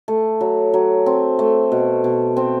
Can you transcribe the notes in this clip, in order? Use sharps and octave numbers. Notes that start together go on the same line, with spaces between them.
A3
F#3
F#3
C4
A3
B2
B2
C4